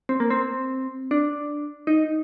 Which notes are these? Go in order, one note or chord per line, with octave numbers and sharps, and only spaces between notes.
C4
A#3
C4
D4
D#4